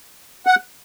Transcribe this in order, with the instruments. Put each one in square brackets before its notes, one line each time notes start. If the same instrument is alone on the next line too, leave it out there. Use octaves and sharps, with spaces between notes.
[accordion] F#5